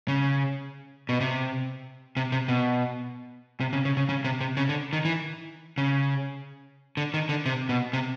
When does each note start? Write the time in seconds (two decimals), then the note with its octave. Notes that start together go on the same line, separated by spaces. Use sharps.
0.08 C#3
1.09 B2
1.21 C3
2.17 C3
2.32 C3
2.48 B2
3.60 C3
3.73 C#3
3.85 C#3
3.97 C#3
4.09 C#3
4.24 C3
4.41 C3
4.57 C#3
4.69 D3
4.93 D#3
5.05 E3
5.78 C#3
6.97 D3
7.14 D#3
7.29 D3
7.46 C3
7.69 B2
7.93 C3